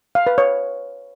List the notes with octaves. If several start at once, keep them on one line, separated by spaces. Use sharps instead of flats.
F5
B4
C#5